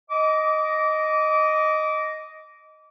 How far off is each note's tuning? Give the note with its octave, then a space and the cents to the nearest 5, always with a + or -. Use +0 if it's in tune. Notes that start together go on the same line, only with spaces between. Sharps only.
D#5 +0 D6 -25